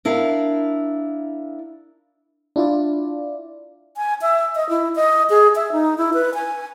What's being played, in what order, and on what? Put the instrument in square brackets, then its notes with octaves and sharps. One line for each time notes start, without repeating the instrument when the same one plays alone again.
[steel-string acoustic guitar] D4 E4 A#4 F5
[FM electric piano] D4 E4 F4 D5
[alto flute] G#5
E5
D#5
E4
D#5
G#4
E5
D#4
E4
B4
G#5